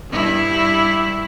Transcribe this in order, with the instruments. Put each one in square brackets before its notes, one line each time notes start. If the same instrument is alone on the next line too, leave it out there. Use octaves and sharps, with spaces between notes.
[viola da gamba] G2 G3 E4